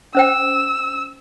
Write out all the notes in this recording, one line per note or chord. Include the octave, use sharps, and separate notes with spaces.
C#4 C5 G5 E6